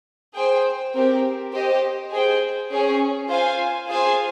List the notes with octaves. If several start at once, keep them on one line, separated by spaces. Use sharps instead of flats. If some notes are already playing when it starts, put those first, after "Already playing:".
G#4 C5 G5
C4 G4 A#4
G4 C5 D#5
G#4 C5 G5
C#4 G#4 C#5
F4 C5 F5 G#5
F4 G#4 C5 F5 G#5